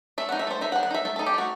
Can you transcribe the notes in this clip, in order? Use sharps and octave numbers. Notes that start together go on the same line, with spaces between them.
A3 E5
F#5
D#4
E5
A3 C5
D#4 E5
F#5
D#3
F#5
D#4 E5
A3 E5
A4
D#4
G4
A3 F#4